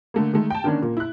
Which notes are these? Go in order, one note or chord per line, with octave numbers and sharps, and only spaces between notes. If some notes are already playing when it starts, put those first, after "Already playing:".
D3 A3 A#3
D#3 G#3 A3
G5 A5
D3 D#3 A#3 C#4 D4
A#2 A#3
E4 F#6